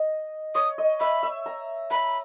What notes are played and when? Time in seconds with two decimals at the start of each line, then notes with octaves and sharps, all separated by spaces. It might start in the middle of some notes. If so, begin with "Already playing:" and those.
Already playing: D#5
0.55 C#5 D#6
0.78 D#5
1.00 E5 B5
1.23 E5
1.46 A#5
1.91 A#5 B5